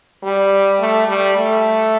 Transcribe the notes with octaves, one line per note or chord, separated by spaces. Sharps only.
G3
A3
G3
A3